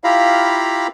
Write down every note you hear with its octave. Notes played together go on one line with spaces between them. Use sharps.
E4 F4 G4 F5 A#5 B5